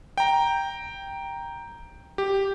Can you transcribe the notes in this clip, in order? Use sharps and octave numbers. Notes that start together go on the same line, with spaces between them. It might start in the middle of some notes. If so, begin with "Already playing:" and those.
G5 A#5
G4